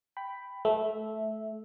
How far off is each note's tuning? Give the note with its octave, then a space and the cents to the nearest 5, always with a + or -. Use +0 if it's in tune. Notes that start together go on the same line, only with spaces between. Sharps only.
G5 +0 B5 +10
A3 -20 E5 -5